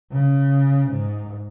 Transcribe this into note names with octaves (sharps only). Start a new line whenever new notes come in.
C#3
G#2